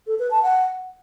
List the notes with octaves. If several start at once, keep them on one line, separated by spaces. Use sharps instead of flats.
A4
B4
A5
F#5